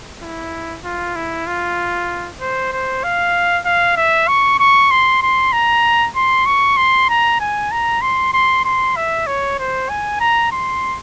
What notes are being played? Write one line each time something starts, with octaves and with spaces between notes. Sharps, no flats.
E4
F4
E4
F4
C5
C5
F5
F5
E5
C#6
C#6
C6
C6
A#5
C6
C#6
C6
A#5
G#5
A#5
C6
C6
C6
E5
C#5
C5
G#5
A#5
C6